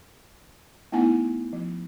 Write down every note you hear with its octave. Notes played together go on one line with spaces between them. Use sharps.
A3 B3 D#4 E4 F#5 G#5
F3